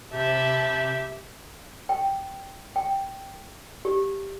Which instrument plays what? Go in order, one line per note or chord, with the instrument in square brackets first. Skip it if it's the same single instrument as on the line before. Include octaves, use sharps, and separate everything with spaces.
[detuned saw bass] C3 [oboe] G4 [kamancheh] E5 [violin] A5 B5
[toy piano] G5
G5
G4